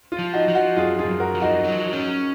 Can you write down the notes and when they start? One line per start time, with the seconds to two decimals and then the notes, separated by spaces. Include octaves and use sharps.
0.12 F4
0.19 F3
0.33 D#4 F#4
0.48 F3
0.55 D#4 F#4
0.77 F#2 F4 G#4
0.98 F4 G#4
1.05 F#2
1.20 F#4 A#4
1.35 F3
1.42 D#4 F#4
1.64 F#3
1.93 C#4